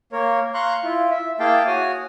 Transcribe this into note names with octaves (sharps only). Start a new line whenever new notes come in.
A#3 A#4 C#5
F5 A#5 C6 C#6 F#6
E4 F4
E5
A#3 E4 G#4 F5 G5 A5
F#4 C#5 G#5 D#6